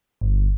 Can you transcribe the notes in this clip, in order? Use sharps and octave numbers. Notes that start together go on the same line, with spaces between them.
G1